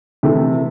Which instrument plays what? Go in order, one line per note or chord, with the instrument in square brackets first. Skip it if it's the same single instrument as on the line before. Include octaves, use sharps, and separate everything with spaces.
[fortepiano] C3 E3 A3